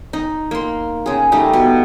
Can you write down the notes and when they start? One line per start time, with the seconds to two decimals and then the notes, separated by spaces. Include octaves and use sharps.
0.13 D#4
0.51 A#3 C6
1.06 C#3 G#4
1.32 G3 A3 D#4
1.53 B2